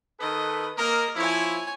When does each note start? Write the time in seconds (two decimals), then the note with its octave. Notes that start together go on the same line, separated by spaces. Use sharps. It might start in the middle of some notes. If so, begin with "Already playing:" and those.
0.20 D#3 A4 B4 D#5
0.77 A#3 A#4 D#5
1.16 F3 E4 C#5 G#5